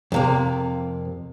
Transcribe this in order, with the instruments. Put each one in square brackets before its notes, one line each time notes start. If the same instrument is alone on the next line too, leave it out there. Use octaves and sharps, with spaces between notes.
[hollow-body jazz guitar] F2 C3 A#3